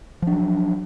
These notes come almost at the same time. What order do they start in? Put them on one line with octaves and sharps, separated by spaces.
F3 D4 F#3